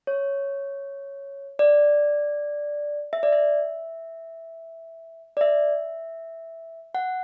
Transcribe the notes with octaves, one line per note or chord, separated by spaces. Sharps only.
C#5
D5
E5
D5
E5
D5
E5
F#5